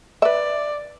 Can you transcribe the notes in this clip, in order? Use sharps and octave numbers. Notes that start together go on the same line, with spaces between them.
B4 D5 E5